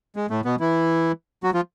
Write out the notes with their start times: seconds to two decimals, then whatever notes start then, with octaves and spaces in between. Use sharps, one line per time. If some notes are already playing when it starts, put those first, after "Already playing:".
0.16 G#3
0.30 A2 A3
0.45 B2 B3
0.60 E3 E4
1.44 F#3 F#4
1.54 F3 F4